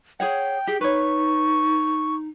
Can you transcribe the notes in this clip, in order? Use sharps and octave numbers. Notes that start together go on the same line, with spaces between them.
G#4 C#5 F#5 G5
G4 G#4
D#4 B4 C#5 C#6